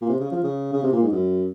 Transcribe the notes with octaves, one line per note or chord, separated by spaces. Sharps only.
A#2
C3
C#3
F3
C#3
C#3
C3
A#2
G#2
F#2